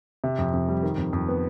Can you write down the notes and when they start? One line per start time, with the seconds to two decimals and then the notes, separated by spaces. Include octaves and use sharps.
0.24 C3
0.38 F2
0.53 F2
0.68 G3
0.83 D#3
0.98 F2
1.13 F2
1.29 B3